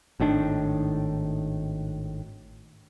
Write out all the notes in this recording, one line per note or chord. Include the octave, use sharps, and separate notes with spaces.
G#1 A2 D#3 D4